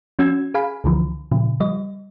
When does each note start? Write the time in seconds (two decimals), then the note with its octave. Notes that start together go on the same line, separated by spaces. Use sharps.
0.19 F3 C#4 F#4 E6 G#6
0.54 G#4 F5 G#5 B5
0.84 C#2 D3 E3 F3
1.32 A#2 C#3 F3
1.60 F3 G3 D#5